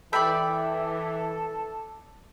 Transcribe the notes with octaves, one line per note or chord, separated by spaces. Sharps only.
E3 A4 D5 E5 G5 B5